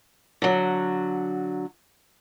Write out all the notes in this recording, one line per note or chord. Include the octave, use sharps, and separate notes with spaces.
D3 F#3